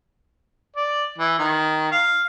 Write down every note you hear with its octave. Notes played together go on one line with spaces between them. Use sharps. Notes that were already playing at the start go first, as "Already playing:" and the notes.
D5
E3
D#3
F5